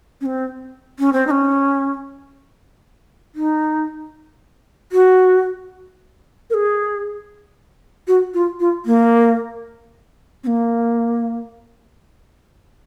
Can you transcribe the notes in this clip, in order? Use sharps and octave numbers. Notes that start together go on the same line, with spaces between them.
C#4
C4
C#4
C4
D#4
C#4
D#4
F#4
A#4
G#4
F#4
F4
F4
A#3
C4
A#3